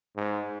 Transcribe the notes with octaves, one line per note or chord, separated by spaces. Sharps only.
G#2